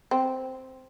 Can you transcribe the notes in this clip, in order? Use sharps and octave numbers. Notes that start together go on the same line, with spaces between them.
C4